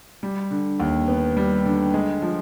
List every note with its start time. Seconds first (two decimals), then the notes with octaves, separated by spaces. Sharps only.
0.23 G3
0.51 D3
0.80 D#2
1.08 B3
1.37 G3
1.65 D3
1.94 G#3
2.22 F3